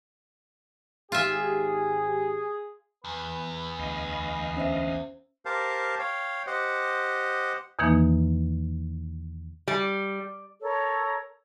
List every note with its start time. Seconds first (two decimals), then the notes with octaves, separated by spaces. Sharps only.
1.12 G#1 G#2 F4 G4 G#4 E5
3.05 E2 B4
3.79 D2 D#5 F5
4.57 C#4 C5 E5
5.45 G4 A#4 C5 F5 A5
5.99 C#5 F5 G5
6.47 G4 C5 D#5 F#5
7.79 E2 B2 D#3 E3 A#3 D#4
9.68 G3
10.61 A4 A#4 C#5